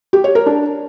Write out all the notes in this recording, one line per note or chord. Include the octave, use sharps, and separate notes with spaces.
G4
C#5
A#4
D4